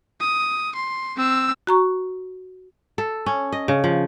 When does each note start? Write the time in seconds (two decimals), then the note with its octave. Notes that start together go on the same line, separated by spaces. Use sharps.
0.21 D#6
0.75 C6
1.17 C4 E6
1.67 F#4 A#5 C#6
2.98 A4
3.26 C#4
3.52 D#5
3.68 C#3
3.84 F3